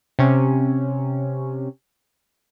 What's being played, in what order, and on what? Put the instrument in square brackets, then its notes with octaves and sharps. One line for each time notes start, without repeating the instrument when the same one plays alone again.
[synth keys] C3 C#4